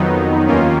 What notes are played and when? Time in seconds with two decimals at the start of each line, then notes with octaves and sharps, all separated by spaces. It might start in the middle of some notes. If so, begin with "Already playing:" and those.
Already playing: F2 D#3 F#3 B3 D#4
0.47 D#2 D#3 A#3 C#4 F4